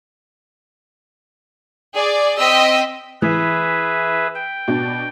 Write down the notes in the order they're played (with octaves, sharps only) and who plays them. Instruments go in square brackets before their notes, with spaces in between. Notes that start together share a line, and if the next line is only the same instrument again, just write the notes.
[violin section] G#4 D5
C4 D#5 G5 E6 B6
[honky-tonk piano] E3 [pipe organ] G#4 B4 E5
[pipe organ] G5
[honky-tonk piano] B2 D4